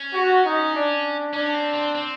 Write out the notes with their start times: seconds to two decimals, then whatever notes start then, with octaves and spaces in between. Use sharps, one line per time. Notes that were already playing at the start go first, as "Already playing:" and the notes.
Already playing: C#4
0.12 F#4
0.44 D#4
0.74 D4
1.33 C#4 D4
1.54 C4
1.74 C4
1.95 C4